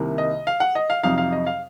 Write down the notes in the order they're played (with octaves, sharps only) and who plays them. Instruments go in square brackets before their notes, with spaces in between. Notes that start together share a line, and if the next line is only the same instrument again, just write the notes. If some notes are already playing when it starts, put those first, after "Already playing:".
Already playing: [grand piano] C2 C3 D#3 A#3
D#5
F5
F#5
D#5
F5
F2 C3 F#3 C4 D#4 F5
F5
D#5
F5